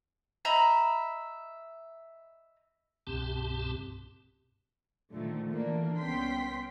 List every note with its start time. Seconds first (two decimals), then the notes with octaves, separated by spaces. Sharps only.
0.45 D#5 E5 A#5 B5
3.07 C2 G2 B2 C4 G4 A5
5.12 A#2 D3 D#3 F3 A3
5.50 D3 E3 A#3 D4
5.99 C2 B3 C#4 G5 C6 B6